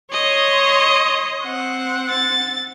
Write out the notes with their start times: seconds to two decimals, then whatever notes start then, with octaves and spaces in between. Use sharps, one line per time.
0.13 C#5 D#5 C6
1.44 C4 F#5
2.10 A6